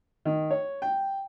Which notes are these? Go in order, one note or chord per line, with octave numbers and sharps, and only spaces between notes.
D#3
C#5
G5